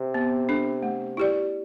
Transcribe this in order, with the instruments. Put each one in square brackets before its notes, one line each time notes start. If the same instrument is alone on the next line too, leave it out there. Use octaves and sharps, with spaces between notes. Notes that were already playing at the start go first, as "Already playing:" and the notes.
Already playing: [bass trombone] C3
[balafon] B3
D4 A4
A3
E4 G4 D5